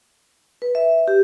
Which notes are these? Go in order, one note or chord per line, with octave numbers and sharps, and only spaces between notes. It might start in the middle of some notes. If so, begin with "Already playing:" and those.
B4
E5
G4